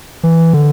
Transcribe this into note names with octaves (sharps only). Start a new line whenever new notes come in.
E3
D3